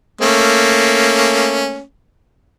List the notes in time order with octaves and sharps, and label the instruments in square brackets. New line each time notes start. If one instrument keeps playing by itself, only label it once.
[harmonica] A3 A#3 C#4